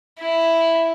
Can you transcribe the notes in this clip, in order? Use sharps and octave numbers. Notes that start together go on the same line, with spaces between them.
E4